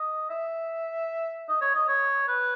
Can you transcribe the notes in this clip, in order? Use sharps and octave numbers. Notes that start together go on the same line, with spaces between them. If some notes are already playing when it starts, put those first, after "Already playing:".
Already playing: D#5
E5
D#5
C#5
D#5
C#5
B4